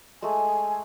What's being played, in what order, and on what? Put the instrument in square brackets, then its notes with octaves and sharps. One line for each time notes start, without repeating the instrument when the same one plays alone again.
[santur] G#3 A3 [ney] G#5